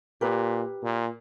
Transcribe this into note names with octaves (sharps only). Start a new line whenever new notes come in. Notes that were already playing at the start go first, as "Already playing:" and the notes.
A#2 G4 A#4 B4
A#2